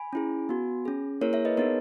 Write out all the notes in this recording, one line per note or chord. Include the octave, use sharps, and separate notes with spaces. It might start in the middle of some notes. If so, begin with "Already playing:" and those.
Already playing: G#5 B5
C#4 E4 G#4
B3 F#4
C#4 G#4
A#3 E4 G#4 A#4 C#5
C#5 E5
B4 D#5
B3 D#4 G#4 A#4 C#5